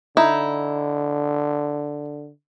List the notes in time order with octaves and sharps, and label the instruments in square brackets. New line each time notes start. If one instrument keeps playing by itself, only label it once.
[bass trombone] D3 [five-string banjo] D#4 E4